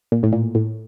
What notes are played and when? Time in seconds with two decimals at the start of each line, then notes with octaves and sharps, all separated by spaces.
0.12 A#2
0.23 A2
0.33 A#2
0.55 A2